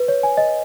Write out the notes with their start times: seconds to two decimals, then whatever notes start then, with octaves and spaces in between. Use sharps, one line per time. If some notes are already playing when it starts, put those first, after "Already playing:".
Already playing: B4
0.08 C#5
0.23 G#5
0.37 D#5